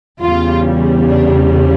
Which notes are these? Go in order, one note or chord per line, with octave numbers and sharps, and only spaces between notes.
E2 C#3 G3 F4
D4